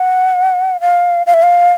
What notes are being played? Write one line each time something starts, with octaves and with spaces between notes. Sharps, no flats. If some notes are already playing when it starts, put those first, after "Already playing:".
Already playing: F#5
F5
F5
E5
F5